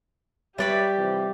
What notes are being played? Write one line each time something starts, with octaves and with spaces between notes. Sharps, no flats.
G3 G4 B4 C#5 D5 E5 B5
C3 E3 F3